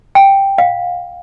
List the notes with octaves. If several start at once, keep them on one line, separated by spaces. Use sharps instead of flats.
G5
F5